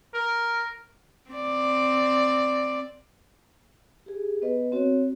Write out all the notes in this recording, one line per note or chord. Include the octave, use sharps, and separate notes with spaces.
A#4
C4 D5
G4 G#4
B3 B4 D#5
C4 F#4 C#5